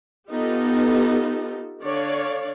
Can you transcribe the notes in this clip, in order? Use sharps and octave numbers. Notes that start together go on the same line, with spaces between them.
B3 D#4 F4 G4 A4
D3 C#5 D5 F5